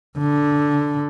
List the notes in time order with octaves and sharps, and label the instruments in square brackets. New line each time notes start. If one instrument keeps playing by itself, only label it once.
[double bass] D3